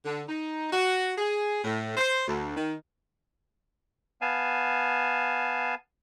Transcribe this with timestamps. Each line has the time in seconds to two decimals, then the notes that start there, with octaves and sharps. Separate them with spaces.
0.05 D3
0.29 D#4
0.73 F#4
1.18 G#4
1.64 A2
1.97 C5
2.27 D2
2.57 D#3
4.21 B3 F5 G#5 A5